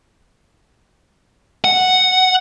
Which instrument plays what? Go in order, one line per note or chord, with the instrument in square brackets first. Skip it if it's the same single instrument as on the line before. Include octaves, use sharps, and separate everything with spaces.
[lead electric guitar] F#5